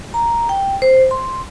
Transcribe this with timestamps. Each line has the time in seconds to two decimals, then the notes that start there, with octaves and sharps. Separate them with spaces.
0.14 A#5
0.49 G5
0.82 C5
1.11 C6